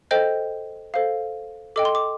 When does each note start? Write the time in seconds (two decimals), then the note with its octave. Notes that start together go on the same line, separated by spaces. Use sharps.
0.11 A4 C5 D#5 G5 G6
0.94 A4 C5 F5
1.76 A4 D#5 G5 D6
1.85 C6
1.95 D6